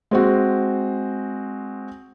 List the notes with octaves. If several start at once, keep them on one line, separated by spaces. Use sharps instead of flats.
G#3 C4 F#4